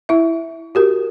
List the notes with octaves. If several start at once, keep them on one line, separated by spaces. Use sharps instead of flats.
E4 E5
F#4 G4 A#4